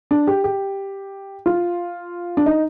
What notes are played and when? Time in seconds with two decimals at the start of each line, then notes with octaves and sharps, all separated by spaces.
0.11 D4
0.27 G4
0.44 G4
1.46 F4
2.37 D4
2.46 D#4